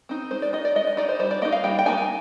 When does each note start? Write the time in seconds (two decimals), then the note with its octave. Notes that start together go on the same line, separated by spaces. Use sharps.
0.09 C4 D#4
0.31 G#3 C5
0.42 D5
0.53 D#4 D#5
0.65 D5
0.75 G#3 D#5
0.87 D#5
0.97 D#4 D5
1.09 C5
1.19 G3 C5
1.31 D5
1.42 A#3 D#4 D#5
1.52 F5
1.64 G3 G5
1.79 G5
1.86 A#3 D#4 G#5
1.98 G#5